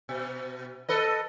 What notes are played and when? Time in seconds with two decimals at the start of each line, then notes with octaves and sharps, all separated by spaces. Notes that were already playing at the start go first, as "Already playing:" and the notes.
0.09 B2
0.88 A4 B4 D#5